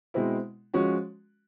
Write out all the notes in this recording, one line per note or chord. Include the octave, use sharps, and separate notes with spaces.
B2 G#3 C4 E4
F3 G#3 C#4 F#4